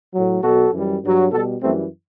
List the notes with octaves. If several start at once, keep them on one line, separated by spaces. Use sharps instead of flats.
A2 F#3
B2 F#3 F#4 A4
F#2 E3 G3
G2 F#3
B2 G3 F#4 A4
F#2 E3 G3 A3 C4